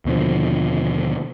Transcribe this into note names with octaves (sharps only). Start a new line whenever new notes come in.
D#2 B2 D3 F3